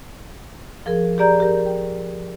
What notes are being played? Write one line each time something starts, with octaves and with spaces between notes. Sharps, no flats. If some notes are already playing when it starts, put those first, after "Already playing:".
F3 G#4 A#4
G4 G#4 D5 A#5 G6
G4 A#4
G5